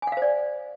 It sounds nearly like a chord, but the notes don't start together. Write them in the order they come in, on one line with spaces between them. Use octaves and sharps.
G#5 F#5 F5 C5 D5